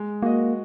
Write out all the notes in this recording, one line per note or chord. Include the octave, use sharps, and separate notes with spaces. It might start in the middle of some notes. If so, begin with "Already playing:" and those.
Already playing: G#3
A#3 F#4 D#5